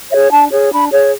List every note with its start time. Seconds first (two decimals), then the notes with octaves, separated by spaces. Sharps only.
0.11 G#4 C#5 E5
0.31 D4 A5
0.52 G#4 C#5
0.72 D4 B5
0.92 G#4 C#5